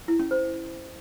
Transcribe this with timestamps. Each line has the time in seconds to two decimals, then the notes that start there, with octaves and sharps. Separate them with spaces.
0.08 E4
0.20 C#4
0.31 C5